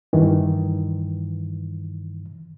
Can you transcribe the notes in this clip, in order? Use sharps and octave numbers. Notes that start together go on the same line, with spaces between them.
G2 D#3 E3